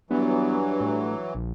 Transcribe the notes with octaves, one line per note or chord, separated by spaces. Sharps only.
G2 E3 F#3 B3
A2
A#1